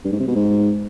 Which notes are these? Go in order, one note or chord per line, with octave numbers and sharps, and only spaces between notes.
G2
G#2
C3
B2
G#2